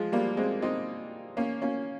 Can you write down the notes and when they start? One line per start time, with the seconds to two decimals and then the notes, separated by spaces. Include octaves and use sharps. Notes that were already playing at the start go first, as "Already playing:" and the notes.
Already playing: F3 G#3
0.12 G3 A#3
0.37 G#3 C4
0.62 C4 D#4
1.37 A#3 C#4
1.62 A#3 C#4